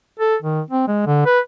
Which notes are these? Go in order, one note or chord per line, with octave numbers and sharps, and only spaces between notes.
A4
D#3
C4
G#3
D3
B4